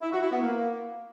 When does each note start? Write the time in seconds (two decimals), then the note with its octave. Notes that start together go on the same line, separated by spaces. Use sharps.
0.02 E4
0.12 F#4
0.21 E4
0.31 B3
0.41 A#3